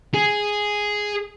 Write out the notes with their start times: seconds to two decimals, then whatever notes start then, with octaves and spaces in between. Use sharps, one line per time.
0.14 G#4